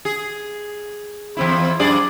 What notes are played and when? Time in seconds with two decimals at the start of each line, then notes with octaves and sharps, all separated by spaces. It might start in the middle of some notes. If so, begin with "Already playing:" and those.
0.05 G#4
1.37 E2 C4 E4
1.79 F#2 G#4 D5